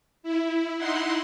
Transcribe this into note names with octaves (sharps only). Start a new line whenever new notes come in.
E4
D#4 E4 F#5 C6